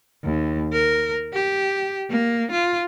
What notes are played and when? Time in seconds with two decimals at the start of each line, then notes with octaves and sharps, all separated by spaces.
0.24 D#2
0.73 A#4
1.33 G4
2.10 A#3
2.52 F4